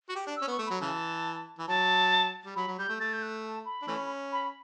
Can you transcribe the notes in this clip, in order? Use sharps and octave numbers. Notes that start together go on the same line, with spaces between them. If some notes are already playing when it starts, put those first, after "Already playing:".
F#4
G4
D4
E6
C#4
B3
C#6
A3
F#3 B5
C#3 E3 A5
E3
F#3 A5
G3
F#3 B5
F#3
G3 G6
A3
A3 A6
G6
F#6
A5
B5
D4
E3 A3 C#4
B5